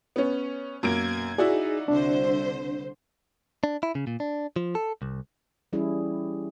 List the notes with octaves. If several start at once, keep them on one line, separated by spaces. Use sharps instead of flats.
B3 C#4
F#2 B2 A#3 G#6 D7
D#4 E4 F#4 G#4 D5
C2 D3 D4 C5
D4
E4
C#3
A#2
D4
F3
A4
C2
E3 G3 C#4 E4 G#4